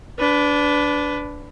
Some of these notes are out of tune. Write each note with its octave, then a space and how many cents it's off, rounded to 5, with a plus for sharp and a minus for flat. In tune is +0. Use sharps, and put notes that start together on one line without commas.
D4 -15 B4 +15